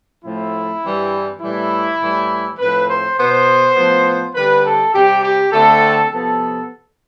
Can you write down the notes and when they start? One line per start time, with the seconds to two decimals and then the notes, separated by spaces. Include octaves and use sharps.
0.23 A2 F3 A3 C4 E4
0.82 G2 E3 G3 C4
1.41 A2 E3 G3 E4
2.00 A2 E3 G3
2.58 A2 F3 C4 B4
2.88 C5
3.17 B2 B3 C5
3.76 A2 F3 B3
4.35 D3 G3 C4 B4
4.64 A4
4.94 C3 G3 C4 G4
5.23 G4
5.52 D3 A3 C4 A4
6.11 C3 F3 B3 A4